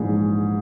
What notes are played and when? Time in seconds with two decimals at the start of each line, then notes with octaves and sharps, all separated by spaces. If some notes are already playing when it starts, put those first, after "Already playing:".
Already playing: A#1 G#2 E3 G#3 G#4